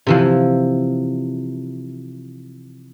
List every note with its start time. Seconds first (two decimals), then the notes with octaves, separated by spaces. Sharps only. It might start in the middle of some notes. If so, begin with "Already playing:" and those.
0.07 C3 E3 F3